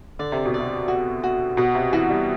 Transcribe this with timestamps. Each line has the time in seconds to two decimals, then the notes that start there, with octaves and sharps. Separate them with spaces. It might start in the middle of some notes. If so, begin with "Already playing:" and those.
0.19 D3 D5
0.32 C3
0.46 B2
0.54 D5
0.59 C3
0.88 C3 F#4
1.24 F#4
1.57 B2 F#5
1.75 C3
1.93 E3 F#4
2.10 G3